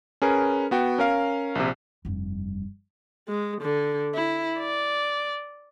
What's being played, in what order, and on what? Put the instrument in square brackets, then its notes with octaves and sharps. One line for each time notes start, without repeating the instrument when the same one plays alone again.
[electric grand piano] C#4 G#4 A#4 B4
B3 F#4 G5
C#4 A#4 F5
A#1 C3
[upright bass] F1 G2
[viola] G#3
D3
E4
D5